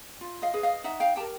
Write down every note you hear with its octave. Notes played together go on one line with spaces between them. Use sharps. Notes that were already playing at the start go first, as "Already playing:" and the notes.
F4
D#5 F5
G#4 B4
D#5 F5
D#4 E5 F#5
F5 G5
G4 A#4 G5 A5